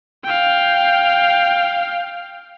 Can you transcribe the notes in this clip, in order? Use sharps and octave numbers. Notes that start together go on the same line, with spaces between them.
F5 G5